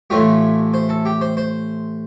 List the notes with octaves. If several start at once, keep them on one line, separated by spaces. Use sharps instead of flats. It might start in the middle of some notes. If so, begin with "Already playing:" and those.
A1 A2 A3 F4 G4
C5
A4
G4
C5
C5